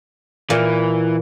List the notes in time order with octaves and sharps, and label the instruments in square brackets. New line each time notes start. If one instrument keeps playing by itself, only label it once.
[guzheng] A#2 [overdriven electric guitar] E3